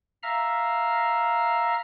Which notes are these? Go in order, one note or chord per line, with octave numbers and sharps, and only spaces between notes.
E5 F5 A#5 F6